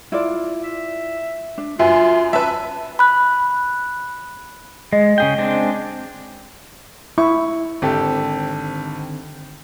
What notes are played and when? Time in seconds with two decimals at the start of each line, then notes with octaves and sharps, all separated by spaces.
0.12 E4 F4 D5
0.63 E5
1.58 D4
1.79 F#2 F4 B4 E5 G#5
2.33 C#4 B4 E5 A5
2.99 B5 F#6
4.92 G#3 D#5
5.18 C#3 G#4 G5
5.38 G#3 C4 D4
7.18 E4 E5 C#6
7.82 G#1 D3 D#3 C4 G4 A4